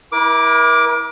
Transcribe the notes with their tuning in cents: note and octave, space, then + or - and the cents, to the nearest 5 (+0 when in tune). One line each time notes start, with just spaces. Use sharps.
E4 -20 A#4 +40 D6 +0